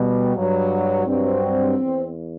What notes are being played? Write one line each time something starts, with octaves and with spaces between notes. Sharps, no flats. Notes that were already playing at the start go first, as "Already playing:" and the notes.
Already playing: B2 G3
G2 F#3
G2 F#3 C4
E2